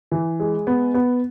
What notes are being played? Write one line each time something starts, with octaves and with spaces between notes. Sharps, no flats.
E3
G#3
B3
B3